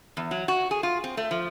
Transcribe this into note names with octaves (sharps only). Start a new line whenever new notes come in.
E2
F#3
F#4
G#4
F4
C4
A3
F3